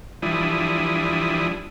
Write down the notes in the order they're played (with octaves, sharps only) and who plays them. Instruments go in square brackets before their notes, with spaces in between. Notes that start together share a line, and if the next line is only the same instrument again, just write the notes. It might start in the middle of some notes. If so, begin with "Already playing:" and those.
[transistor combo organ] E3 F3 G3 D4 E4 D#6